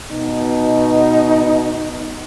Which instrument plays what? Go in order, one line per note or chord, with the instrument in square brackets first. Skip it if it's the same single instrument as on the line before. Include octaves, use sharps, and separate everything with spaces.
[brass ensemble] B2 [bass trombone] D#4